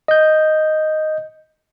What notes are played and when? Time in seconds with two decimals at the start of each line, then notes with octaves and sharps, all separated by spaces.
0.08 D#5 G6